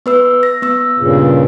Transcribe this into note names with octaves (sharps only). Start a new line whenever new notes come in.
B3 B4 E6
A#6
B3 E6
G2 A#2 C#3